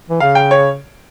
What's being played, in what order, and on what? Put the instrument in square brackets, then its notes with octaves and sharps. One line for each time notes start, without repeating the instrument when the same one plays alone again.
[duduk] E3
[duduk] C#3 [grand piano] F5
[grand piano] G5
C#5